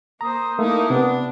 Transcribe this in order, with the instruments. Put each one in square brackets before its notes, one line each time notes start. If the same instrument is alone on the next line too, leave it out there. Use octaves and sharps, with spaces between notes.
[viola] A#3 C5 [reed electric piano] A#5 [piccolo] D#6
[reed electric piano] A3 [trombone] A#3 [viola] D#4 E4
[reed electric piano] C3 [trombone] B3 [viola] D4